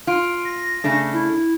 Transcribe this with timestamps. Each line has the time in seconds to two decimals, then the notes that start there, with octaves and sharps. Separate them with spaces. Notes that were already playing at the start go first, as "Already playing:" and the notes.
0.07 F4 D7
0.45 A#6
0.84 C#3 A3 D4
1.13 E4